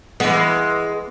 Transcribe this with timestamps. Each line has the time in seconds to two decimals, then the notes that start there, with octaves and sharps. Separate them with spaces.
0.20 E3 G#3 B3